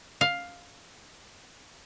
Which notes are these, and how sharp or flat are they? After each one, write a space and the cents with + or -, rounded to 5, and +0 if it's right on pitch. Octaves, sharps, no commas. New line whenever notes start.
F5 +10